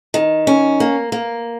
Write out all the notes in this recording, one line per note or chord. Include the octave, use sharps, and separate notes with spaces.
D#3
C#4
A#3
A#3